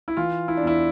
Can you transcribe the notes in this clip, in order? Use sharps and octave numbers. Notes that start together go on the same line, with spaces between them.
E4
E3 F4
E4
D4
E2 E4